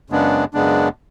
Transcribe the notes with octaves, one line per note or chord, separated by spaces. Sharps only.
F#2 C#3 G#3 B3 D4
F#2 C#3 G#3 B3 D4